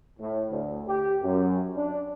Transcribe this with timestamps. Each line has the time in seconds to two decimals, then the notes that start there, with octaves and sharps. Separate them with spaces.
0.20 A2
0.50 D2
0.88 G4
1.23 F#2
1.76 D4